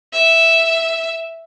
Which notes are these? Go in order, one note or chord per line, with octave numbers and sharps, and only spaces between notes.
E5